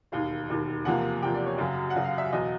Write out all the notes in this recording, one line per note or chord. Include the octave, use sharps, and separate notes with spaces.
E1 D#2 D#3 F5
E1 D#2 D#3
E2 C3 F3 A#3 F#5
E2 C3 F3 A#3 G5
D5
C#5
F#2 C#3 F#3
F#5
F#2 C#3 F#3
F5
E5
E2 B2 F#3 D#5